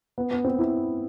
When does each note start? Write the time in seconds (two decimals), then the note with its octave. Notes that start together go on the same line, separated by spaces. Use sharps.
0.18 B3
0.31 B3
0.44 C4
0.59 E4